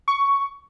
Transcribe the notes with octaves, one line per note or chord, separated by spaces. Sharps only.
C#6